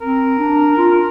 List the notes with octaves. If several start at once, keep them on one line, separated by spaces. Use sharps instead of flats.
C4 A#4
D4
F4